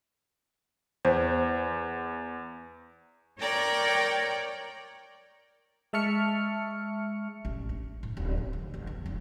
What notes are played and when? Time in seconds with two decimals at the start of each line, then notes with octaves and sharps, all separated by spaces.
1.05 E2 C5
3.40 A#4 C#5 D5 G5 A#5
5.93 G#3 E5 A5 C#6 F6 C#7
7.45 A1
7.69 D4
8.03 A2
8.17 D1
8.37 F4
8.53 D2
8.74 G1
8.87 E2
9.06 F1